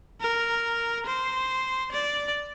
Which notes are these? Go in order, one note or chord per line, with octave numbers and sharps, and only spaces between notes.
A#4
C5
D5